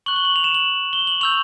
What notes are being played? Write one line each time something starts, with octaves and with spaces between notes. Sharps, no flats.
C#6 F#6 F#7
G7
F#7
F7
E7
F#7
G7
F#7
C#6 E6 G6 F7